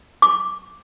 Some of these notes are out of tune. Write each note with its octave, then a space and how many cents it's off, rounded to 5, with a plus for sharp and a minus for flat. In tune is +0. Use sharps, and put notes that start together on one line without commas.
D6 -5